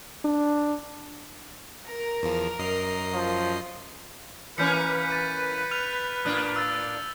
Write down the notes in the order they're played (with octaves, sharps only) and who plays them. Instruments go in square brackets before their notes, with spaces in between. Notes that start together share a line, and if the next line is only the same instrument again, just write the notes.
[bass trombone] D4
[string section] A#4
[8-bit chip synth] E2 F3
F#2 D#5 C7
[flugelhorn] F3
[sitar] E3 A#3 C#4 [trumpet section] B4 [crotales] G6 B6 C#7
[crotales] A6 D#7
F6 F7
[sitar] A2 A#3 D4
[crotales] E6 A6